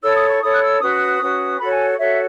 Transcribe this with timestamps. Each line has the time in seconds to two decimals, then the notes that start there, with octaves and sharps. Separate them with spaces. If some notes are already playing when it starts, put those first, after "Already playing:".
0.02 E4 A4 C#5 E6
0.15 D#6
0.28 C#6
0.41 E4 A4 C#5 D#6
0.54 F#6
0.61 E6
0.80 C#4 F#4 B4 D#6
1.20 C#4 F#4 B4
1.58 F#4 A4 C#5 B5
1.72 G#5
1.97 F#4 A4 C#5 E5